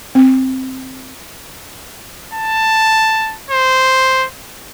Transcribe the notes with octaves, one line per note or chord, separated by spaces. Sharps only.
C4
A5
C5